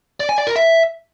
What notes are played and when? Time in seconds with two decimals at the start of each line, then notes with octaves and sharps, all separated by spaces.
0.20 D5
0.29 G#5
0.38 D5
0.47 A#4
0.56 E5